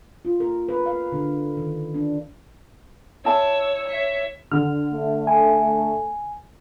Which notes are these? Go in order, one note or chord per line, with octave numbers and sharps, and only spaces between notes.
F4
A#4
B4
F5
D3
D#3
D4
E4 C#5 A5 E6
C#5 E5
D3 F6
A3
G#5